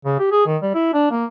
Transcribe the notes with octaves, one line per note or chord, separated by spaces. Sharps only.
C#3
G4
G#4
D#3
G3
E4
D4
A#3